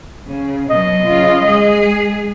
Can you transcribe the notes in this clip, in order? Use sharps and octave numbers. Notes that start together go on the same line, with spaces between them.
C#3
B2 F#3 D#5
C#3 F4
G#3 G#4